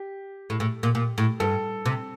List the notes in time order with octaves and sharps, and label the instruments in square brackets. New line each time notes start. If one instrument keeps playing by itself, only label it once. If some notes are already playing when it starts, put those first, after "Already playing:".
Already playing: [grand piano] G4
[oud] A2
A2
A#2
A#2
A2
[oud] G2 [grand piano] A4
[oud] C3